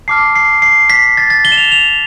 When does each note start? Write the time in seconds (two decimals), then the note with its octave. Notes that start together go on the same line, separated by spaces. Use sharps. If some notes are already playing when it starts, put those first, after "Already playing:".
0.08 A5 D6 F6 C7
0.35 C7
0.62 C7
0.90 B6
1.17 A6
1.30 A6
1.45 G7
1.52 E7
1.57 F7
1.72 F7